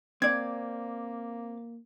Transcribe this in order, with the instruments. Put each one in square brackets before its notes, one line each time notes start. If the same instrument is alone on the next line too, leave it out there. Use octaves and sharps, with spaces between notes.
[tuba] A#3 [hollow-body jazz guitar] C4 D5 [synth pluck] G#6